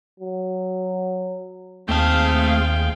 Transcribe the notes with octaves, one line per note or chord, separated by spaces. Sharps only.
F#3
D#2 A3 C4 F4 G#4 F5 G5 A5